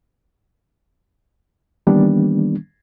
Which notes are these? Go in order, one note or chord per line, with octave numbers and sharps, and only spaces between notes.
D#3 E3 G3 A#3 B3 D4